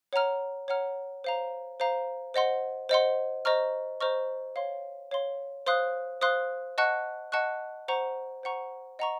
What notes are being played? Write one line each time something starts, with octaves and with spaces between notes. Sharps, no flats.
C#5 F#5 A#5 F6
C#5 F#5 A#5 F6
C5 F5 A#5
C5 F5 A#5
C5 D#5 F#5 C6
C5 D#5 F#5 C6
C5 D#5 A#5 C#6 F6
C5 D#5 A#5 C#6 F6
C#5 F5 C6
C#5 F5 C6
C5 F5 C6 D#6 F#6
C5 F5 C6 D#6 F#6
D#5 F#5 A5 C#6 F#6
D#5 F#5 A5 C#6 F#6
C5 F#5 A#5 C#6
C5 F#5 A#5 C#6
D#5 F#5 A#5 C#6